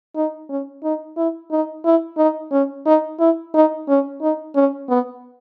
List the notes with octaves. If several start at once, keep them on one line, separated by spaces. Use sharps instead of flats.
D#4
C#4
D#4
E4
D#4
E4
D#4
C#4
D#4
E4
D#4
C#4
D#4
C#4
B3